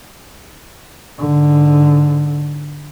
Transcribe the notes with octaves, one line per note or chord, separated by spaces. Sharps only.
G#2 D3